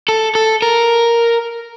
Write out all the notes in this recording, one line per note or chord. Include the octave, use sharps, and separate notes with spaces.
A4
A4
A#4